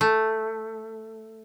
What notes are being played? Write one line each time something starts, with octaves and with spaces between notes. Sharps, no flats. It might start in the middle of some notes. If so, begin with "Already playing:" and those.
A3